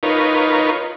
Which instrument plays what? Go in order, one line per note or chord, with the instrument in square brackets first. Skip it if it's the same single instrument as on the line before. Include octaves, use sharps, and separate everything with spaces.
[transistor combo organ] D#4 F4 A#4 B4 C#5